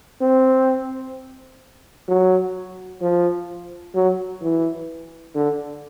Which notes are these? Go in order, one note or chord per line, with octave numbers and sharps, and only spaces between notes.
C4
F#3
F3
F#3
E3
D3